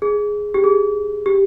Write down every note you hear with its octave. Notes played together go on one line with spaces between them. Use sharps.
G#4
G4
G#4
G4